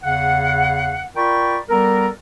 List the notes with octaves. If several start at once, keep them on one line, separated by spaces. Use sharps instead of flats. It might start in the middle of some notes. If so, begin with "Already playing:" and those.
E2 C#3 F5 F#5
F4 A#4 D5 G5 B5 C#6
G3 B3 A4 A#4